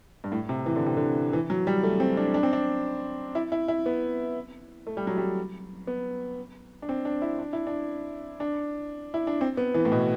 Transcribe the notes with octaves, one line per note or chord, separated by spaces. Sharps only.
G2
A2
C3
E3
D3
C3
D3
E3
F#3
G3
A3
C4
D4
D4
C4
D4
E4
E4
E4
B3
A3
G3
F#3
G3
B3
D4
C4
D4
E4
D4
E4
D4
D4
E4
D4
C4
B3
E3
A2
B2